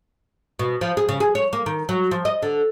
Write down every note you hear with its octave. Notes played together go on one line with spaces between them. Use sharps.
B2
F3
G#4
C#3
G#4
C#5
A#3
D#3
F#3
F3
D#5
D3